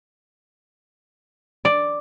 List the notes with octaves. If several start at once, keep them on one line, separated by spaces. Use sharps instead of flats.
D5